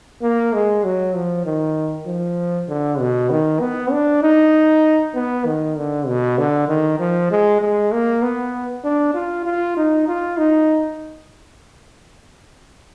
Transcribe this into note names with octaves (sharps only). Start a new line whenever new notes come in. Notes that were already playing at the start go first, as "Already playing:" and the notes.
A#3
G#3
F#3
F3
D#3
F3
D3
B2
D#3
B3
D4
D#4
B3
D#3
D3
B2
D3
D#3
F3
G#3
G#3
A#3
B3
D4
F4
F4
D#4
F4
D#4